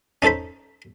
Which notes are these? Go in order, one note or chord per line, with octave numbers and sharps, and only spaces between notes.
C#4 D#4 A4 C5 B5